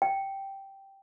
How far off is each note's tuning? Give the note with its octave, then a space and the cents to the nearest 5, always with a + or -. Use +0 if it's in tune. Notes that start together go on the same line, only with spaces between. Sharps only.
G5 -5